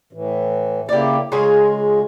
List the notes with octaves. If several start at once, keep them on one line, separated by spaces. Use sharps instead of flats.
A2 E3
C#3 A#3 E4 G4 D5
C#3 G#3 F4 G#4